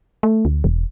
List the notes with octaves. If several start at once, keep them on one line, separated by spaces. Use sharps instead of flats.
A3
D2
E1